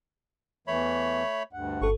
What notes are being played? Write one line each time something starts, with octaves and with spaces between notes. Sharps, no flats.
E2 E3 A3 C#5 B5
D2 G2 F#5
G1 A4 C#6